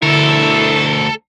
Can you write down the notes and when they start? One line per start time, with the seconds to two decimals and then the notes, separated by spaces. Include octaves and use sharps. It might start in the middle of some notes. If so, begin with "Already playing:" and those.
0.02 D2 D3 F#3 A3 E4 A4 A#4